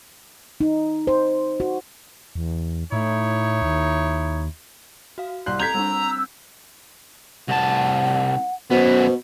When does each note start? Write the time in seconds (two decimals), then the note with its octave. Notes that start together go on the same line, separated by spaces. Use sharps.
0.61 D#4
1.07 C5
1.60 F#4
2.35 E2
2.92 A2 D#4 E4 C#5
3.62 D#2
5.18 F#4 F5
5.46 C2 C6 F#6 G6 C7
5.60 C4 A4 A#5 G6 G#6 B6
5.75 G3 C4 D4 E6
7.49 C2 F#5 A5
8.71 F#2 B2 B3 C5